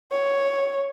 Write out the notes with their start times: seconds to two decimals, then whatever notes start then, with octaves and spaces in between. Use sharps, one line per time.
0.12 C#5